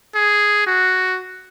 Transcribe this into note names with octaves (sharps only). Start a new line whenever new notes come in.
G#4
F#4